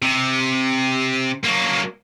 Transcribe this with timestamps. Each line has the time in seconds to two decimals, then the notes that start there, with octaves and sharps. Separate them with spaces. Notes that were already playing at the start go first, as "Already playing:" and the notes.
0.02 C3
1.44 F#3 A#3